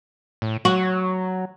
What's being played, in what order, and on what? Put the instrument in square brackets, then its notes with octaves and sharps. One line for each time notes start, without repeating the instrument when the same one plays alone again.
[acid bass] A2
[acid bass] F#3 [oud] F#4